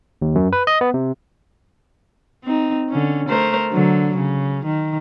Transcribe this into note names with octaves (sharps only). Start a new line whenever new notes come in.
D#2
F#2
B4
D#5
B3
C3
C4 D#4
D3 C#4
A3 A#4 C5
D3 F#3
C#3
D#3